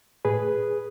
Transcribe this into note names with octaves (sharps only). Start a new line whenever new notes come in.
A2 G#4 B4